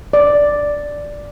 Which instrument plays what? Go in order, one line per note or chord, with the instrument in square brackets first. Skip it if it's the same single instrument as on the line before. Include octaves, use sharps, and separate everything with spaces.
[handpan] D5